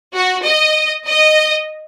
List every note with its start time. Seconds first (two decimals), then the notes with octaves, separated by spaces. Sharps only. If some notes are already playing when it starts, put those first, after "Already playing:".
0.15 F#4
0.46 D#5
1.08 D#5